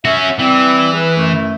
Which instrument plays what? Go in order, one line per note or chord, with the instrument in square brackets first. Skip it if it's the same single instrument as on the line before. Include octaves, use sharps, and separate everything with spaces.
[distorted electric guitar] C#4 F#4 [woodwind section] E5
[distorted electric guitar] E3 [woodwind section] G3 C4
[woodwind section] G#4 B4
F#2 A3